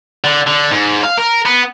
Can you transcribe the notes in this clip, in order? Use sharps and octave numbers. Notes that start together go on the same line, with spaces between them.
D3
D3
G#2
F5
A#4
B3